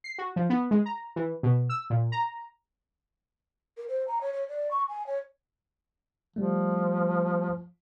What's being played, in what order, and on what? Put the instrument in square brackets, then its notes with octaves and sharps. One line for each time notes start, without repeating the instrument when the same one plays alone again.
[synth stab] C7
F#4
F3
B3
G#3
A#5
E3
B2
E6
A#2
A#5
[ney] A#4
C5
A#5
C#5
C#5
D5
C#6
G#5
C#5
[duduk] F3 [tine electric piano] G3 A3